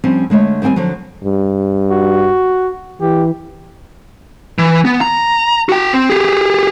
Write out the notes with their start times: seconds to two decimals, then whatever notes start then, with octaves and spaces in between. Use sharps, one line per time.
0.04 F3 G3 C4 C#4
0.30 D3 G#3 A3 C#5
0.62 D#2 G3 C4 G5 G#5
0.76 D3 F3 F#3
1.24 G2
1.91 F#4
3.01 E3 G4
4.58 E3
4.85 B3
5.01 A#5
5.69 F#4 G5
5.93 C4
6.09 G4 G#4